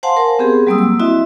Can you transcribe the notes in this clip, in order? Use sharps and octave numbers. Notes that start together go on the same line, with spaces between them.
C5 F5 F#5 G#5 A5 C6
A#4
B3 C4 G4 G#4
F#3 G3 A#3 C4 D#6 E6
E6
C4 E4 F#4 D#5 E5